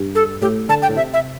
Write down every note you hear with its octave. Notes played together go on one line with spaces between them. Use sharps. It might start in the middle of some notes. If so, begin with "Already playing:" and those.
Already playing: G2
A4
A2 G4
D3 A5
G5
A2
C3 E5
E5